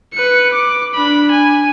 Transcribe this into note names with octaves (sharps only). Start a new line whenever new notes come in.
B4 C#7
D6
D4 B5
G#5